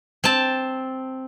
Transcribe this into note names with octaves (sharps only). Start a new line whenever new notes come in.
C4 A5